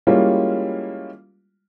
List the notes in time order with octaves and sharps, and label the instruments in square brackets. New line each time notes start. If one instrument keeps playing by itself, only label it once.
[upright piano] G3 G#3 A#3 C#4 E4 F4